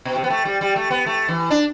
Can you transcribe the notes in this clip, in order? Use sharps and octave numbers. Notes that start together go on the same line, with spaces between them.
B2
C3
B3
A3
G3
G3
A3
B3
A3
E3
D4